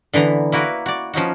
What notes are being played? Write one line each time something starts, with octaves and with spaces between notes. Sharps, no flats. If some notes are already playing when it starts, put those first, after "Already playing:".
D3 E3 B3 A#5
A#3 E4 F#4 A#4 B4
F#4 D5
F3 C#4 D#4 F#4